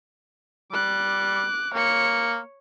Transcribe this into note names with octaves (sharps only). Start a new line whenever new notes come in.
G3 D6 F#6
A#3 C#5 C#7